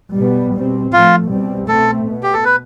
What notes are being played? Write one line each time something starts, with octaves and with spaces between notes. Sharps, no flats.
B2 G3 B3
B2 G3 C4
A2 F3 A3 F4
C2 B2 G3 C4
B2 A3 C4 A4
B2 B3
G4
A4
B4